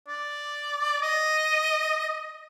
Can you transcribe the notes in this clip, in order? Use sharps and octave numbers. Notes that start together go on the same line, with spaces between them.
D5
D#5